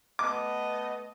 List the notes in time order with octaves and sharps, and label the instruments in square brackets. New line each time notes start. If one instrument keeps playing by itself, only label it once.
[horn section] A3 B3 D#5 [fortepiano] D6